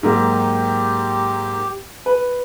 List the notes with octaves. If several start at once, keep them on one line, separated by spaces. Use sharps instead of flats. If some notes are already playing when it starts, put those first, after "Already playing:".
G#2 F#3 A#3 G4
B4